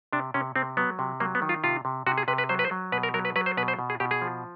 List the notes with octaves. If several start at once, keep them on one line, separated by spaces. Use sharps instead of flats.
C3 D4
C3 C#4
C3 C4
F#3 B3
C3
F#3 A#3
B3
D#3
F4
C3 F4
C3
C3 F#4
G#4
C3 B4
B4
F#3 C5
B4
C5
F#3
B2 B4
A#4
F#3 A#4
B4
F#3 B4
C5
B2 B4
C5
B2
G#4
B2 G4
G#4
F3